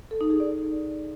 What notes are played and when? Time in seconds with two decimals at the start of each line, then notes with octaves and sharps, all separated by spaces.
0.11 A4
0.21 D#4
0.30 G#4
0.40 D5